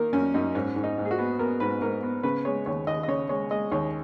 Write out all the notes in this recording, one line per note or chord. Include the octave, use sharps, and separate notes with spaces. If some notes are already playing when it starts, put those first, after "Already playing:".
Already playing: D#3 A#3 A#4
F#2 C#4
F#2 D#4
G#2 C#4
G#2
D#4
G#2
G#4
F#4
B3
B3 A#4
G#2 B4
G#2 A#4
B3
C#3 B4
G#3 C#5
D#2 C#5
D#2 D#5
D#5
C#3 C#5
G#3 C#5
G#3 D#5
D#2 C#5